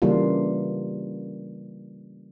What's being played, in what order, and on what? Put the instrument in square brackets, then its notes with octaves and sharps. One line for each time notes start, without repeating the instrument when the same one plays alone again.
[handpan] C#3 E3 G3 A#3 D4 F4